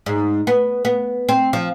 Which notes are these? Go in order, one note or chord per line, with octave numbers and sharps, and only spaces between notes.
G#2
B3
B3
C4
F3